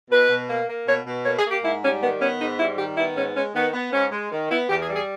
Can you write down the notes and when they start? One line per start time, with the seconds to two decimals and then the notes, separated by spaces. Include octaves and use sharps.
0.11 B2 B4
0.30 B2
0.49 A#3
0.68 A#3
0.87 B2 C#5
1.06 B2
1.26 A#3 C#5
1.38 G#4
1.45 A#3
1.50 G4
1.64 G#2 E4
1.83 G3 C#4
2.01 D#3 B3
2.21 B3 C#4
2.40 G#2 D#4
2.59 G3 E4
2.78 D#3 G4
2.97 B3 E4
3.16 G#2 C#4
3.35 G#3 C#4
3.55 D#3 B3
3.73 B3
3.92 G#2 C#4
4.11 G#3
4.31 D#3
4.50 B3 E4
4.69 E2 G4
4.82 G#4
4.89 G3
4.95 G#4